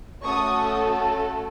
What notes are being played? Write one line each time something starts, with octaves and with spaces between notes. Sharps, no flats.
A3 C#4 F#4 A4 C#6 D#6